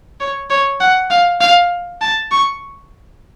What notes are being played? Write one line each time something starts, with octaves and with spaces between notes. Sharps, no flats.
C#5
C#5
F#5
F5
F5
A5
C#6